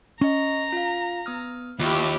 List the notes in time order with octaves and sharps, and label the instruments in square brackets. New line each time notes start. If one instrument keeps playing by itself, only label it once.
[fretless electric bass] C#4 [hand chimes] D#5 C#6 [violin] A#5
[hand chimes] F4 F5
B3 D#6 F6
[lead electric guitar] D#2 [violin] E4 G4 [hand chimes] F4 B5